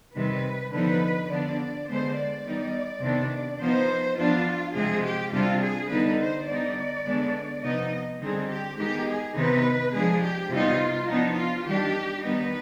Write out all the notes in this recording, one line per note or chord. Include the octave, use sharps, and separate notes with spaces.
C3 D#3 G3 B4
D3 F3 B3 D#4 B4
D3 F3 B3 D4 D5
D3 G#3 B3 C5
D5
D#3 G3 B3 D#4
C3 D#3 B3 D4
F3 B3 D#4 C5
F3 B3 D4 F4
C3 F3 G#3 G#4
G4
C3 G3 D4 F4
G#4
D3 G3 B3 D#4 B4
C5
D3 G3 B3 D#4 D5
D3 G#3 B3 D4
C3 F3 B3 D#4 D#5
D3 G3 C4 D#4 G#4
G4
D#3 G#3 B3 D#4 G4
G#4
C3 D#3 B3 D#4 B4
F3 G#3 D4 G#4
G4
C3 G3 B3 D#4 F4
F3 B3 D4 D#4
F4
D#3 G3 D4 G4
D#3 G3 B3 D#4 B4